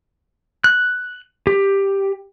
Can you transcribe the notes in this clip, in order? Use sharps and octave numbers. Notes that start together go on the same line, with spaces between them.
F#6
G4